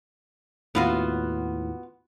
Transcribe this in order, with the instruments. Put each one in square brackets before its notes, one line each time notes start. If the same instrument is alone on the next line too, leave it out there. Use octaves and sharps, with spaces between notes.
[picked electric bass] D#2 A2 [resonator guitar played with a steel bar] B3 F4 F#4